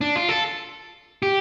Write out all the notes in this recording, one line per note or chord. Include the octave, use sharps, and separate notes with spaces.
D4
F4
A4
G4